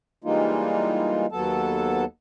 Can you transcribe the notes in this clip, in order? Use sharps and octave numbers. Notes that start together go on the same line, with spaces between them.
E3 G3 G#3 A#3 D#4 F4
D#2 F#3 B3 A4 A5